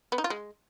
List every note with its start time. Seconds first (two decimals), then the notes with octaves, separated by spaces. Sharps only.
0.12 B3
0.18 D#4
0.24 F4
0.30 G#3